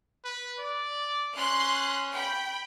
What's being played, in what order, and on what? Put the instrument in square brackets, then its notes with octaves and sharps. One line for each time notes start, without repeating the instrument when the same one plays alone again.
[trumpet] B4
D5
[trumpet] C#4 [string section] C6 F#6
[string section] G5 B5